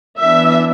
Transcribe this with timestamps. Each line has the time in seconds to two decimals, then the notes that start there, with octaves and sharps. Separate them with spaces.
0.19 E3 B3 D4 E5